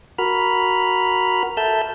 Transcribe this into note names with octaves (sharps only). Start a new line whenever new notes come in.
F#4 A#4 B5 F6
A4 E5 A5 E6 G6